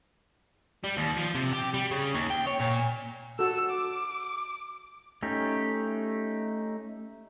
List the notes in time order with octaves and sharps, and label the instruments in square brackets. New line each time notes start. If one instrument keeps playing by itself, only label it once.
[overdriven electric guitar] G3
D#2
F3
C3
G4
G3
C#3
D#2
G5
C#5
A#2
[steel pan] F#4 A4 [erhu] E6
[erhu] D6
[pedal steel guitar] A3 C#4 D#4 G4